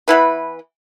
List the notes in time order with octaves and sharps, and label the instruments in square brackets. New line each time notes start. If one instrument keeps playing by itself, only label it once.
[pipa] E3 B3 E4 B4